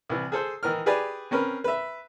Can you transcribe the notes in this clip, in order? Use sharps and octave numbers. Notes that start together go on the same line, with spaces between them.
C2 E3
G#4 A4 C5
D#3 E3 A#4 F6
G4 G#4 B4 D5 G#5
C4 C#4 A#4 B4
B4 E5